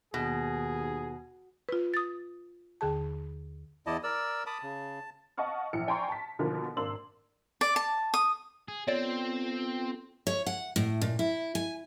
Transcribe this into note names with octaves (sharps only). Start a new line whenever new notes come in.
D#2 B2 G#4
F4 B4
D#6 A6
D#2 D3 G#4 A5
E2 E4 D5 D#5 A5
A#4 D5 E6
A5 B5 D6 D#6
C#3
D#5 F5 F#5 A5 C#6 F6
A#1 E3 C#7
D5 G5 G#5 A#5 C6 C#6
A5 B6
B2 D3 D#3 F3 A#3
G#1 A#3 D4 C6 E6 F#7
D5
A5
D#6
G#4
B3 C4 F4 A4 C#5 D5
C#5
F#5
A2
A#2
E4
G#5